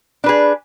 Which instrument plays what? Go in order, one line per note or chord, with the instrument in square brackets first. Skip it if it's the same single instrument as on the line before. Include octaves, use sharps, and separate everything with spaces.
[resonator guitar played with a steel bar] D4
B4
G#4